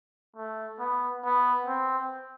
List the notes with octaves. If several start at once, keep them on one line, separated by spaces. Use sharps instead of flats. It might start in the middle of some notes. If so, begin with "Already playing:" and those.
A3
B3
B3
C4